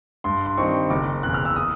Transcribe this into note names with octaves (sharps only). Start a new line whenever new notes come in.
G2 C6
C6
D#3 G3 C4 D#4 C#6
F#1 D6
E2 C#3 F#6
F6
E6
D#6